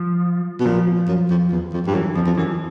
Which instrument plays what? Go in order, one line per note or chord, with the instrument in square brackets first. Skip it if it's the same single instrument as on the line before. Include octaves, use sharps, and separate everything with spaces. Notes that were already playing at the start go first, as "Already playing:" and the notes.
Already playing: [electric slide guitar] F3
[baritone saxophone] B2
[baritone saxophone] A#2 [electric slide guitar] F3
[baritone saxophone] F#2
F2
E2
F2
G2
[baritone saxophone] F#2 [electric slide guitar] E3
[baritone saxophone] F2 [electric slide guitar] F3
[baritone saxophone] F2
[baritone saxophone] F#2 [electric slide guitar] E3